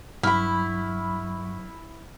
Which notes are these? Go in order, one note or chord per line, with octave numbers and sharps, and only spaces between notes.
G2 F#3 E4 B5 C#6 F6